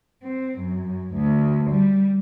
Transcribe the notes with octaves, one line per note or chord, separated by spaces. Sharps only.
C4
F#2
D2
G3